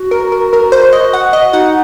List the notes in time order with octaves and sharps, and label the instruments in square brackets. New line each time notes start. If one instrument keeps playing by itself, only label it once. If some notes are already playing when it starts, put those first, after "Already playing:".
Already playing: [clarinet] F#4
[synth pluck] A#4
A#4
A#4
C5
D#5
F#5
D#5
[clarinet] D#4 [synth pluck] F#5